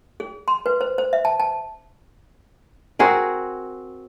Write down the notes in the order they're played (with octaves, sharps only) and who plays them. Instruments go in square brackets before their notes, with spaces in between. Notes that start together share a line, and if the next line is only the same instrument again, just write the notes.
[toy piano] G#4
C6
B4
C5
C5
E5
A5
A5
[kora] C4 F#4 G#4 A#4